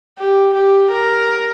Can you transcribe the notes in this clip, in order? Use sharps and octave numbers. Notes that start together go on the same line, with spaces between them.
G4
G4
A#4